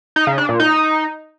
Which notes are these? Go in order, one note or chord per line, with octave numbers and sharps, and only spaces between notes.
D#4
C#3
D4
A#2
D#4